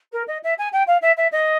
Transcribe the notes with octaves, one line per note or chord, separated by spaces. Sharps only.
A#4
D#5
E5
G#5
G5
F5
E5
E5
D#5